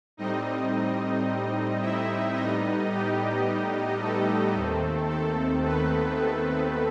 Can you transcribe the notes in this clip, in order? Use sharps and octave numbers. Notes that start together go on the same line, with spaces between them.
A2 G3 C4 D#4 D#5
E4 E5
A2 G3 B3 D#4 D#5
G3 G4
A3 A4
D#2 D#3 A3 C4
A3 A4
B3 B4
A3 A4